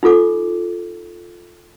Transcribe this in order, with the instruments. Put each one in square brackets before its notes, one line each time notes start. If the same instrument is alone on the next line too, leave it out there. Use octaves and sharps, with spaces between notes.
[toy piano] D#4 F4 A4 D6